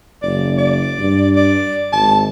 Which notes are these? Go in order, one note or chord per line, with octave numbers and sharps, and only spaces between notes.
F#1 D5
D5
G2
D5
G#1 A5